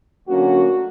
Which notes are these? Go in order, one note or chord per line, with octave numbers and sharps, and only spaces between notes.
D2 D3 F#3 A#3 C#4 F#4